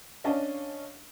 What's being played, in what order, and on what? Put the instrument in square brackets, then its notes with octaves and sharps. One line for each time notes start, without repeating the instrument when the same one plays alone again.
[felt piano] C#4 D4 D#5 F5 A5